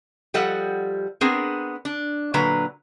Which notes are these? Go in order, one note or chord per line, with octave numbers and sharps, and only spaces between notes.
F3 G3 A4 D#5 F#5
B3 C4 D4 G#4 A#4
D4
A#2 D3 F#3 B4 A#5